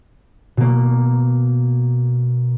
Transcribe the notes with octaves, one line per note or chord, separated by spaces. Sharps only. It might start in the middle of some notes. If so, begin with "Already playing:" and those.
B2 A#3